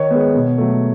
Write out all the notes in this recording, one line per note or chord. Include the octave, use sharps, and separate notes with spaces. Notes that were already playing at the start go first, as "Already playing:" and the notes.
Already playing: D#3 C#5
G#3 B3
B2
F#3 A3